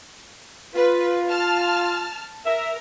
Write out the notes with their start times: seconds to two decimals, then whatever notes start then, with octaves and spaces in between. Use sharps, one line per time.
0.74 F4 B4
1.28 A5 F6
2.45 A#4 E5